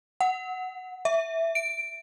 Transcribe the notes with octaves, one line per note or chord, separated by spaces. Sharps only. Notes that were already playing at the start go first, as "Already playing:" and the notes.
F#5
E5
D7